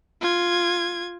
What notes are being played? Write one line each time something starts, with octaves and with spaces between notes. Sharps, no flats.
F4 G#6